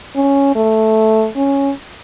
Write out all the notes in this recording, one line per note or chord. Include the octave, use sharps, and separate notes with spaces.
C#4
A3
C#4